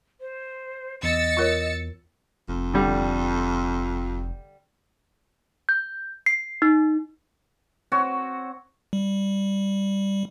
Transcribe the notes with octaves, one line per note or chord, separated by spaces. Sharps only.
C5
E2 D#5 E6 A6 C#7
F4 A#4 C#5
F1 F2
D3 G3
G6
C7
D#4
C4 F#4 C#5
G3